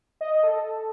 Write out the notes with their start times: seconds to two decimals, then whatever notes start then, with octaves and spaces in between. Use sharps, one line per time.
0.21 D#5
0.43 A4